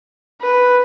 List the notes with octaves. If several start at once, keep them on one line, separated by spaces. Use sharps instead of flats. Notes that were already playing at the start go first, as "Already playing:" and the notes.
B4